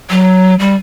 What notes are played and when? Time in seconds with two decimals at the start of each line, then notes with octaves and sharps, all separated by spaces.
0.10 F#3
0.60 G3